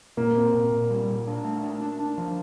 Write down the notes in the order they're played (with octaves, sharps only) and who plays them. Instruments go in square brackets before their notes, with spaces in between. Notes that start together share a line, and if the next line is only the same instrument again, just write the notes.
[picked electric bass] A#2 [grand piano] A#3
[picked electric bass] C4
A#2
A#2
G3
A#2
D4
A3
D4
D4
D4
F3